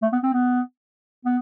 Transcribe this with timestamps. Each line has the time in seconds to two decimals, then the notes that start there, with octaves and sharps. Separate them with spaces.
0.02 A3
0.12 B3
0.23 C4
0.33 B3
1.25 B3